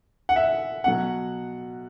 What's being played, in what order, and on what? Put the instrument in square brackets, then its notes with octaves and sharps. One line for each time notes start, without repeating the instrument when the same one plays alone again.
[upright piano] F#5
E5
B2 F#3 F#5